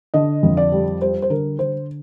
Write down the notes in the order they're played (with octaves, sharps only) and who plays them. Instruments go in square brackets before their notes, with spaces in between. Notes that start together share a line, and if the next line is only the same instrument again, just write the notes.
[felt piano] D3 D#5
F2
D5
G3
G3 C5
C5
D3 A#4
D3 C5